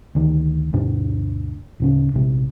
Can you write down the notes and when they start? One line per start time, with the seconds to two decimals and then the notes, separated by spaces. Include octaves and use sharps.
0.15 D2 D#3
0.73 D2 G2 B2 D4
1.80 D1 C#3 C#4
2.14 A#1 C3